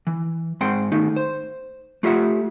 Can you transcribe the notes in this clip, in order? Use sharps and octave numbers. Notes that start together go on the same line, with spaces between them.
E3
G#2 C4 F#5 G5 C6
D#3 A3 D#4
C5
A3 F4 G4 E5 F#5